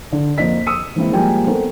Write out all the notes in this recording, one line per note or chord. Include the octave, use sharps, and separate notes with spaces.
D3
F2 A#3 D#5 B6
D#6 E6 C#7 D#7
E3 G#3 A#3 C4 E4
F3 G3 G#3 A#3 G5 G#5
B3 C4 A4 A#4